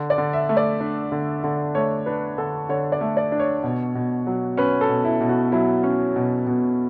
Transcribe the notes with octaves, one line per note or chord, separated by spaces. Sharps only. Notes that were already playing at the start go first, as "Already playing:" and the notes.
Already playing: D3
D5
D3
E5
A3
D5
D4
D3
D3
A3 C#5
D4 B4
D3 A4
D3 C#5
D5
A3
D5
D4
C#5
B2
B2
F#3
C#4 B4
A4
B2
E4
B2
F#4
F#3 E4
C#4
B2
B2